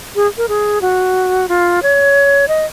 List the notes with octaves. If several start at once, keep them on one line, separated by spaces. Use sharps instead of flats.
G#4
A#4
G#4
F#4
F4
C#5
D#5